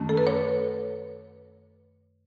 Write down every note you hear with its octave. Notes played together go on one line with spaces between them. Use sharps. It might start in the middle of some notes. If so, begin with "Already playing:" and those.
Already playing: F#2 D#3 A3 C#4
A4
B4
C#5